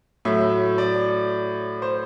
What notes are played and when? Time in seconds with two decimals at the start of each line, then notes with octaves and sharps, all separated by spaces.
0.25 A2 F#3 E5
0.78 D5
1.82 C5